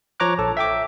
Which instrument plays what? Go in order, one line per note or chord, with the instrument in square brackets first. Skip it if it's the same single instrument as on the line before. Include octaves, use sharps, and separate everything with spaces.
[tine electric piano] F3 C#5 A#5 D6 F#6
A#1 A4 A5
E5 G5 D6